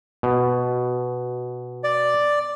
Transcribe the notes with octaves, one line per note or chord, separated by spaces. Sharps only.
B2
D5